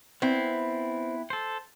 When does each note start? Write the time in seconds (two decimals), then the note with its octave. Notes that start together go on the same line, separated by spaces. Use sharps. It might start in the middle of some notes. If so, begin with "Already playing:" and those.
0.22 B3 C4 E4
1.30 A4 C5